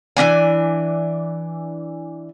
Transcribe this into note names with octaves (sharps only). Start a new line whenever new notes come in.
E3 C#4 D4 G#5